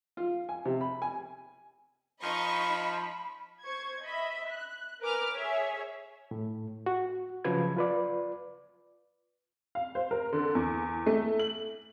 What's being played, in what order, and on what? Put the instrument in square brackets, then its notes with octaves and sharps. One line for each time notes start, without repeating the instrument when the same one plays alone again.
[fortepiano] F4
G#5
C3
B5
G#5
[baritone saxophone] F3 [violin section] D#4 D#5 C#6 [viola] B5
[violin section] C5 C#6 G#6
D#5 E5 B5
F#6
A#4 B4 G#5 D6 F6
G#4 C#5 E5
[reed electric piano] A2
F#4
C#3 F3 F#3 B4 G#6
F4 B4 D5
[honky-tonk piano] F5
C5
A#4
D3
E2
A3
F#7